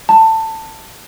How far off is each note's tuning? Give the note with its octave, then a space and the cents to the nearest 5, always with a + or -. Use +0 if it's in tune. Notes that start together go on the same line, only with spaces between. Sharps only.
A5 +20